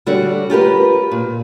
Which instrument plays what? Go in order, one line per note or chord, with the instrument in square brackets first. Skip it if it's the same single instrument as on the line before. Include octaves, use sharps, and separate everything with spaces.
[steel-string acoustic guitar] D3 G3 F#4 C#5 D5
F4 G4 A#4 B4
A#2